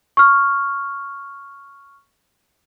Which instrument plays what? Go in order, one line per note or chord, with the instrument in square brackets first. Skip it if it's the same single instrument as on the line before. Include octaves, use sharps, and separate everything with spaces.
[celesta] C#6 F6